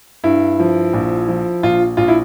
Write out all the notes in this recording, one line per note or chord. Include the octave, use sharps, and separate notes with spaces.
G2 E4
F3
A#1
F3
A#1 F4
A#1 F4
E4